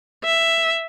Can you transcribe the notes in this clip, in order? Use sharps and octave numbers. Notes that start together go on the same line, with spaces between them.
E5